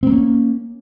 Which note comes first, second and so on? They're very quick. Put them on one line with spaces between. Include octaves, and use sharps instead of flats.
C4 A#3 C#4